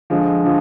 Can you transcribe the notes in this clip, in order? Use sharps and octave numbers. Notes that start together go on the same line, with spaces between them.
D3 F3 G#3
D3 F3